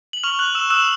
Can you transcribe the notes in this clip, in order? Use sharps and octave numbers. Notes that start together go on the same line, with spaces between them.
F#7
C#6 F6 F7
F#6 F#7
E6 E7
D#6 E6 F#6 E7